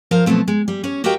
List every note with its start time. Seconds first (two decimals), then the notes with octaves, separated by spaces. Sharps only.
0.11 F3 A#4 C5 F5
0.26 B2 F3 F#3 A3 C4
0.48 G#3
0.68 G3
0.83 C#4 C#5
1.04 F#4 G4 A#4 D#5 F5 G5